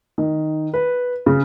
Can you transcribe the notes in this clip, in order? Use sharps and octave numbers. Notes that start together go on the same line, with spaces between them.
D#3
B4
C#3